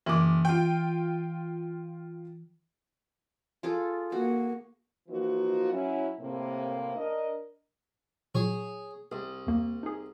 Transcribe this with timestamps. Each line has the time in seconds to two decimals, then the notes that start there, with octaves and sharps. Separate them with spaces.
0.06 F#1 E3 D6
0.45 F4 G5
3.63 F4 G#4 A4
4.12 A#3 F#4
5.08 E3 F3 A#3 D#4 F4 F#4
5.71 F#3 C#4 E4
6.20 A2 C3 A#3
6.96 D4 A#4 D#5
8.35 A#2 F#3 G#4 C#5
9.12 C2 G#4
9.47 E2 A#3
9.83 D#4 G#4